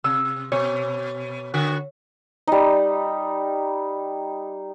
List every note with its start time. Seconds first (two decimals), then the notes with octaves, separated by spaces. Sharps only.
0.04 C3 E6
0.52 B2 C#5
1.54 D3 F#4
2.47 G3 D#4